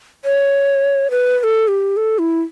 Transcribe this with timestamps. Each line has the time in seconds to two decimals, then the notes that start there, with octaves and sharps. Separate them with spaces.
0.25 C#5
1.11 B4
1.39 B4
1.44 A4
1.68 G4
1.97 A4
2.19 E4